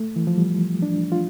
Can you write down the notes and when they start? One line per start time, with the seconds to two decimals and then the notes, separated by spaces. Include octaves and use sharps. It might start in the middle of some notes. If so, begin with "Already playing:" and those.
Already playing: A3
0.16 E3
0.27 F3
0.38 G3
0.82 D4
1.12 F4